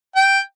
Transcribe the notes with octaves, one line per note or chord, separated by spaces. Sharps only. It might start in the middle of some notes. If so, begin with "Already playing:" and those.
G5